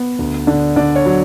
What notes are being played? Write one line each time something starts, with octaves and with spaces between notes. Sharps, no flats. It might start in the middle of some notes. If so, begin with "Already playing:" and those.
Already playing: B3
D2
D3
D3 D5
C#5
F#3